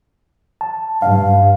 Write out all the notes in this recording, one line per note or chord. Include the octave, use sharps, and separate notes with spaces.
A5
G2 F5